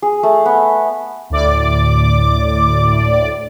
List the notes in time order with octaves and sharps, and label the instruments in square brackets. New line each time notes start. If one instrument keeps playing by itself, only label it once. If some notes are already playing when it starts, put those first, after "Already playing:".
[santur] G#4
A3
B3
[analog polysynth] D2 A2 D5 D6